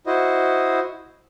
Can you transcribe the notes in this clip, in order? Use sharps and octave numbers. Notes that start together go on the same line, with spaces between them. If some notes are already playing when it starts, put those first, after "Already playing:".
E4 F#4 C5 D#5